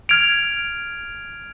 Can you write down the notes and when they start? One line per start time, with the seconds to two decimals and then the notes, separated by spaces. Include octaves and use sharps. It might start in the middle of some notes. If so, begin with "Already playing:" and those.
0.09 F6 G#6 D7 F7